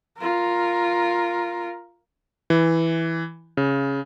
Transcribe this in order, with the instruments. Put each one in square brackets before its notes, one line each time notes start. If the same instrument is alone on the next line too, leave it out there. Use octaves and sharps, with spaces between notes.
[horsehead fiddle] F4 A#4
[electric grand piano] E3
C#3